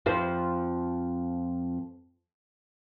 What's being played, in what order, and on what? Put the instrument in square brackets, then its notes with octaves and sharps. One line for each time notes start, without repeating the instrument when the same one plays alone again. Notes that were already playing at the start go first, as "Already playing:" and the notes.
[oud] F2 F3 C5